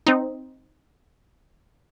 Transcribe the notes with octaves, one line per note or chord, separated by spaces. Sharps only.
C4 D#4